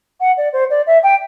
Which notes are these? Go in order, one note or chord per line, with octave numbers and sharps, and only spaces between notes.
F#5
D5
C5
D5
E5
G5